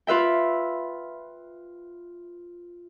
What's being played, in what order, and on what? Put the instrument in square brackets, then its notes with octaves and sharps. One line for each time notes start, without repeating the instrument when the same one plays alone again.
[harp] F4 B4 E5 G5